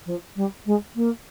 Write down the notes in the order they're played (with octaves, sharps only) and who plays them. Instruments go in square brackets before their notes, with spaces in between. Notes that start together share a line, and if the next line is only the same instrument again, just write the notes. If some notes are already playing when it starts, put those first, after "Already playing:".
[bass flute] F3
G3
G#3
A#3